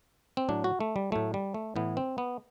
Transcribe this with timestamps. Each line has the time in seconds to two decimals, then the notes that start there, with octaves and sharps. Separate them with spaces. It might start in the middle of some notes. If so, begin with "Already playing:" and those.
0.37 C4
0.49 A2 F#3 D4
0.64 F#4
0.81 A3
0.96 G3
1.12 A2 F#3 A3
1.34 G3
1.54 A3
1.76 A2 E3 B3
1.97 C4
2.18 B3